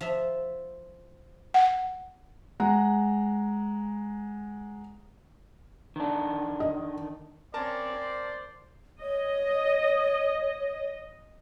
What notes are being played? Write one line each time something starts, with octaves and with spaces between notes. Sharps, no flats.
F3 E5
F#5
G#3 F#5 A#5
D#3 D4
D#5
C4 C#4 A#4 D5 A5
C5
C#5 D#5